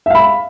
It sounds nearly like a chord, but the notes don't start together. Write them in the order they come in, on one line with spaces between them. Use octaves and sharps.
E5 F5 B5